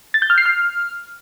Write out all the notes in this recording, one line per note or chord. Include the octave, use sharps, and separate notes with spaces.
A6
G6
F6
C7
F6